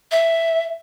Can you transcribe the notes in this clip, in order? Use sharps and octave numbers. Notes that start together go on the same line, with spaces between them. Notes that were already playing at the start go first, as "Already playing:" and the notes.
E5